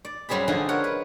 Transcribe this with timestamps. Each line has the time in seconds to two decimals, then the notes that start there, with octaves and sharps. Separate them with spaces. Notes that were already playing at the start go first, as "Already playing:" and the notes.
0.05 D5
0.29 F#2 F#3 G3 C4 G#4 B5
0.48 D3 F3 D#4 G#4 D#5 F#5
0.69 A#4 C#5 F#5
0.84 B4